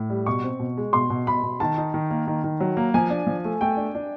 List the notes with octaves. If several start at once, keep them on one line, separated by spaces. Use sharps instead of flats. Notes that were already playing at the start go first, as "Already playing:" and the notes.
Already playing: A2
G3
B2 C#6
C4
B2
G#3
B2 C6
B2
B2 B5
B2
D#3 A5
D#4
D#3
A#3
D#3
D#3
F#3
A#3
F3 G#5
D4
F3
A3
A3 G5
D4
D4